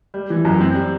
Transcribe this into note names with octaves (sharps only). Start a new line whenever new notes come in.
G3
E3
F#2
C4
G3